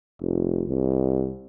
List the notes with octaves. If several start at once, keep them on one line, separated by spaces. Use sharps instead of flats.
F1
C2